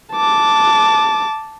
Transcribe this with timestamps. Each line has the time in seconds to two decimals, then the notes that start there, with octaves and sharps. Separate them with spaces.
0.13 A5 D6